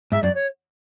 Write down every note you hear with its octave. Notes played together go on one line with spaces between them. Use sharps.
G#2 E5
F#2 D5
C#5